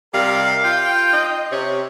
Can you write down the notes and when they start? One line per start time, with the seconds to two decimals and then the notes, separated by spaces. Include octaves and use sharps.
0.14 C3 G3 A#4 F5
0.65 F4 G5
1.13 D#5
1.52 C3 C#5